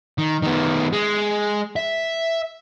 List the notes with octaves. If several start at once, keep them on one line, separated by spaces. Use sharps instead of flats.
D#3
D#3 B3
G#3
E5